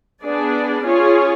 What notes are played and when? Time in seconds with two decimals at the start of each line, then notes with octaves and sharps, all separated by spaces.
0.23 B3 D4 G#4 D5
0.85 C#4 F4 G#4 C#5